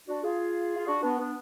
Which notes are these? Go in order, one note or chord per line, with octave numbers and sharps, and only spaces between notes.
D4 F#4
F4 G#4
F4
D4 F#4
B3 D4
B3 D4